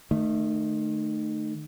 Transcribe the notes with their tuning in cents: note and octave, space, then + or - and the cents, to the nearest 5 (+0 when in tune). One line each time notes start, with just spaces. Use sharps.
D#3 -30 A3 +0